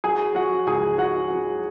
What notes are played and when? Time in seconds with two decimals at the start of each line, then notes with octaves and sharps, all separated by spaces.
0.04 F#3 G#4 G#5
0.35 F#3 F#4 F#5
0.67 C#2 G#4 G#5
0.98 F#3 F#4 F#5
1.31 F#3